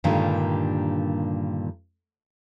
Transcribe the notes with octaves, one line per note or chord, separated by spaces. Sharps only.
G2 A#2 D3 D#3 G3 G#3